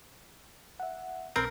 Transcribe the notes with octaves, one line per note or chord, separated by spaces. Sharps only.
E5 F#5
B1 C4 A#4 B5